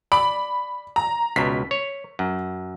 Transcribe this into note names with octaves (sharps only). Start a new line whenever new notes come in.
D5 B5
A#5
C#2 B2 B6
C#5
F#2